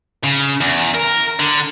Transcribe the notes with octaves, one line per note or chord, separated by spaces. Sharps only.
C#3
E2
A#4
D3